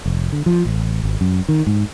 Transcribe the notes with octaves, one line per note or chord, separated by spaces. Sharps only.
F1
D3
F3
A1
G#1
F#2
D#3
G#2